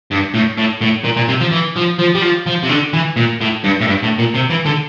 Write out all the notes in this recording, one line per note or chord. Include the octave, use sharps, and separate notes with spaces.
G2
A2
A2
A2
A#2
A#2
C3
F3
E3
F3
F3
G3
F3
F3
C3
D3
E3
A#2
A2
G2
A2
G2
A2
A#2
C3
E3
D3